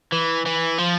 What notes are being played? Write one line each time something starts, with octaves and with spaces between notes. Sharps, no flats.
E3
E3
F3